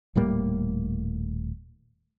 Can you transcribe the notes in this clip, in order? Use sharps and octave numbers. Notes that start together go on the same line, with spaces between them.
D#1 A2 G3 A#3